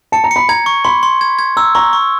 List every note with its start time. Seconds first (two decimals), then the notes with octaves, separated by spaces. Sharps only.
0.12 A5 C#7
0.24 A#5
0.31 B5 C#7
0.49 A#5 G#6
0.66 C#6
0.85 B5 C6
1.03 C6
1.21 G#6
1.39 G#6
1.57 A#5 E6
1.75 A#5 C#6
1.93 C#6